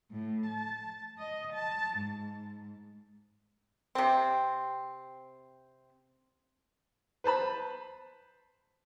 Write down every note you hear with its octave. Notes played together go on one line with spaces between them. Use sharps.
A2
A5
D#5
A5
G#2
C3 C4
B4 C5 A5 B5